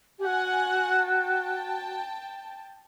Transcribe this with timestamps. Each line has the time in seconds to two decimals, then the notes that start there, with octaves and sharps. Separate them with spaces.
0.18 G4
0.24 F#4 F#5 G#5
1.08 G5 A5